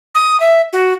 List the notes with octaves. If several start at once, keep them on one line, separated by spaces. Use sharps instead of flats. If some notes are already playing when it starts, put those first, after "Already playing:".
D#6
E5
F#4